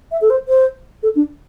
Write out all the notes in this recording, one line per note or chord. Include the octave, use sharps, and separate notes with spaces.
E5
A4
C5
C5
A4
D4